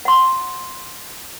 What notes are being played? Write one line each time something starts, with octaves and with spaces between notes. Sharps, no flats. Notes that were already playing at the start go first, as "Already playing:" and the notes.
F#5 C6